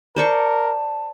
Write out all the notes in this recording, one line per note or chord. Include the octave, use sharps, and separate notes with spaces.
A#4 C5 D5 A5 C#6